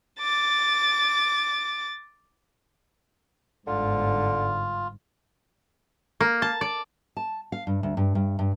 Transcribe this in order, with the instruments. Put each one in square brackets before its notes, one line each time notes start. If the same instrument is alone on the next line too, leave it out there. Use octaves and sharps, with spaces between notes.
[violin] D6 A6
[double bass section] G1 G#2 [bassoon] D3 [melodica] F4
[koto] A#3
A5
D5
[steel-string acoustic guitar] A5
F5
G2
D2
G2
G2
G2